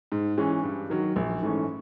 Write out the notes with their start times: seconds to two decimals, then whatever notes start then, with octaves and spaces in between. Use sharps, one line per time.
0.12 G#2
0.37 E3 G#3 C#4
0.63 G2
0.90 D#3 F#3
1.16 A#1
1.42 G#2 E3 A3 C#4